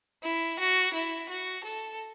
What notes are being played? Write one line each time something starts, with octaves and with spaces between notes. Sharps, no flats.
E4
F#4
E4
F#4
A4